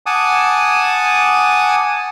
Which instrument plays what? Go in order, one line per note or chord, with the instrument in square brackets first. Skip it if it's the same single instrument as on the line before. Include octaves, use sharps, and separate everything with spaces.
[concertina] F#5 G#5 A5 D6 D#6